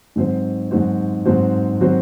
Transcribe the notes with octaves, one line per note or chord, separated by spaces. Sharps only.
G#2 F#3 C4 F#4 C5
G#2 F#3 C4 F#4 C5
G#2 F#3 C4 F#4 C5
F#3 C4 F#4 C5